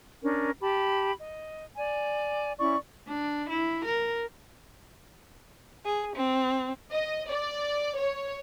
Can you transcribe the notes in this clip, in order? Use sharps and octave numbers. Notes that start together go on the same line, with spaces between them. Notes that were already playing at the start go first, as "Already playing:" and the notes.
C#4 D4 A#4
G4 A5 B5
D#5
D5 G#5
C#4 E4 D5 C#6
D4
E4
A#4
G#4
C4
D#5
D5
C#5